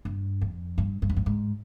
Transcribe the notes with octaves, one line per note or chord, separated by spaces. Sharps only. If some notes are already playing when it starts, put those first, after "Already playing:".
G2
F2
G2
G2
F2
G2
G#2